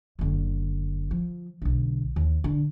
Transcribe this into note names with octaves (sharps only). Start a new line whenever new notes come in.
F#1 D3
F3
B1 D3
D#2
D3